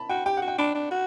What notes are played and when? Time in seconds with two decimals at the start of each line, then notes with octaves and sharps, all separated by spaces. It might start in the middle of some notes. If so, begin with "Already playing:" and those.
Already playing: A5 B5
0.10 F#4 G5
0.26 G4 G5
0.37 F#5
0.42 F#4
0.48 G5
0.58 D4 B5
0.75 D4
0.91 F#4